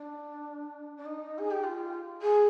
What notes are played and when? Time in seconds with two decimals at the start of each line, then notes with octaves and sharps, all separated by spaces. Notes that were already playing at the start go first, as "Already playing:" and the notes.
Already playing: D4
0.97 D4
1.06 D#4
1.38 G#4
1.51 G4
1.63 F4
2.22 G#4